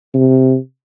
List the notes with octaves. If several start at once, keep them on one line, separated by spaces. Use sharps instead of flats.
C3